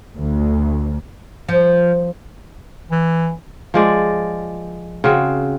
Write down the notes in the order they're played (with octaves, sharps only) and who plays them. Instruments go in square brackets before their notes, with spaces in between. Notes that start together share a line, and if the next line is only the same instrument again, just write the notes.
[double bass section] D2
[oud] F3
[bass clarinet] E3
[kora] F3 G#3 D5
C#3 C4 F#4